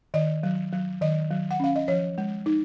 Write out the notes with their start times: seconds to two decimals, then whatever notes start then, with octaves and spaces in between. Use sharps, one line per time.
0.14 D#3 D#5
0.43 F#3
0.73 F#3
1.02 D#3 D#5
1.31 F#3
1.51 F#5
1.60 C#4 F5
1.76 D#5
1.88 F3 C#5
2.18 G#3
2.46 D#4